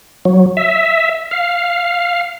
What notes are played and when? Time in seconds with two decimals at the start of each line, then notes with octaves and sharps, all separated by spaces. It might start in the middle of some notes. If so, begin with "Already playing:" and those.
0.25 F#3
0.57 E5
1.31 F5